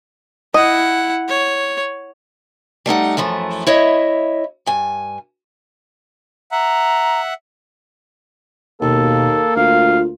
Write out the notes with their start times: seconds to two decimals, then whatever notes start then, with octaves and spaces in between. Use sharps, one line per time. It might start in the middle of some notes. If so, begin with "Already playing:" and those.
0.54 E4 D#5 F#5
1.29 C#5
2.86 G3 A3 D#4 F#5
3.17 F#2 E3 F3 A3
3.67 E4 C#5 D#5 E5
4.66 G2 G#5
6.52 E5 F#5 A#5
8.82 D#2 B2 A#3 A4
9.56 D2 F4 F5